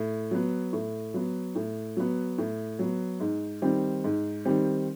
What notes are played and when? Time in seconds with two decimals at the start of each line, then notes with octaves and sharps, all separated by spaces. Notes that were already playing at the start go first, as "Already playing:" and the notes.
Already playing: A2
0.31 F#3 B3
0.73 A2
1.14 F#3 B3
1.55 A2
1.97 F#3 B3
2.38 A2
2.79 F#3 B3
3.20 G#2
3.62 D#3 G3 C4
4.04 G#2
4.45 D#3 G3 C4